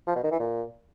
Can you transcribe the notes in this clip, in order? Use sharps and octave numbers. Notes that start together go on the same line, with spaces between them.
F3
B2
D#3
E3
A#2